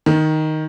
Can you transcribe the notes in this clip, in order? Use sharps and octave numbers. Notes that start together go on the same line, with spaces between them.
D#3